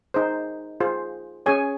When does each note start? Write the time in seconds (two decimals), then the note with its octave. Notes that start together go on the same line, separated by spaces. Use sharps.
0.14 D#4 G#4 C5
0.81 F4 G#4 C5
1.46 C#4 G#4 C#5 G#5